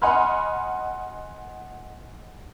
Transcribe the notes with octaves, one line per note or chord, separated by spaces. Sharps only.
D#5 F#5 G#5 B5 C6 F6